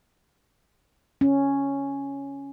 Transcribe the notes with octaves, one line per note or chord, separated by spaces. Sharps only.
C#4